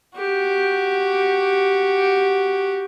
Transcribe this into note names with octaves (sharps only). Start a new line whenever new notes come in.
F#4 G4